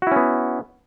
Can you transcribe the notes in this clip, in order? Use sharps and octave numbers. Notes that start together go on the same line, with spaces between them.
B3 C#4 E4 F#4